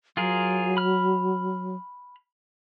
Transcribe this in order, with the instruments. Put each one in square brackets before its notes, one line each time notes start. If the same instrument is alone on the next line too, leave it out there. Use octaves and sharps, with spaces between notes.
[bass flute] F#3 [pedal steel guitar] F4 G#4 A#4
[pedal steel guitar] B5 F6